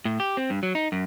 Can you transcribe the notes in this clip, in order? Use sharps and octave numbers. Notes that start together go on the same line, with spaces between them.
A2
G4
C4
G2
F#3
D#4
F#2